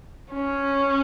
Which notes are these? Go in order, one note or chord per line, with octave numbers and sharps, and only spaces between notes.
C#4